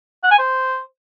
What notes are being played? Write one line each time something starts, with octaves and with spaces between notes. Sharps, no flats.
F#5
G#5
C5